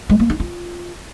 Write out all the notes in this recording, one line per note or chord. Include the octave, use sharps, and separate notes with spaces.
G#3
A#3
D#4
F4